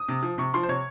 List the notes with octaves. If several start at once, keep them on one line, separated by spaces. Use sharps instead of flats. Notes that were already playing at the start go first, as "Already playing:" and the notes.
Already playing: D#6
C3
F3
C3 C#6
F3 C6
C5
C3 C#5